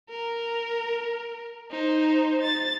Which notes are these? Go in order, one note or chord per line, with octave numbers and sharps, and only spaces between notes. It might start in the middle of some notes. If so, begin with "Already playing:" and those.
A#4
D#4 C5
A6